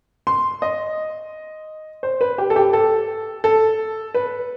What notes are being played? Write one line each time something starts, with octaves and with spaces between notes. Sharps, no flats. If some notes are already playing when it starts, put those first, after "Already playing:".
C6
D#5
C5
B4
G4
A4
G4
A4
A4
B4